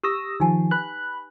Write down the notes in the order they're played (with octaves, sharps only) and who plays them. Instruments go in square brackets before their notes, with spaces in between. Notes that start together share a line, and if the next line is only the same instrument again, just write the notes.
[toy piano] G4 C#6 [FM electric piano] D#6 E6 A#6
[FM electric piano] D#3 F3 [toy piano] D#4 G#5 A5
[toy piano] B4 [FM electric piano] B5 F#6